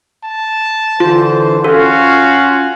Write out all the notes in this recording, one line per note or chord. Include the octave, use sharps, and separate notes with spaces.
A5
D3 E3 F4 C5
C#4 F4 F#4 A4 F5